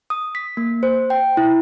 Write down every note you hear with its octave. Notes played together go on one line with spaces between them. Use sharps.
D#6
B6
A#3
C5
G5
E4